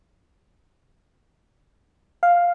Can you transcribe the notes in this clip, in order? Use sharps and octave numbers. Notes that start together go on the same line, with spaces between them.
F5